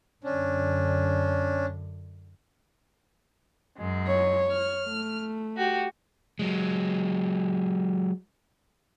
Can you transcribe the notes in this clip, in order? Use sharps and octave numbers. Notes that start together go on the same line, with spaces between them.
F#2 D3 C#4 D4
F#2 G#3
C#5
F6
A3
F#4 G4
F#3 G#3